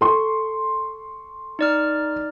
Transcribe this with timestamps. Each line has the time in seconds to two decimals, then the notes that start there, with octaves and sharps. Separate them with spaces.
0.01 A4 C6 C#6
1.59 D#4 D5 F6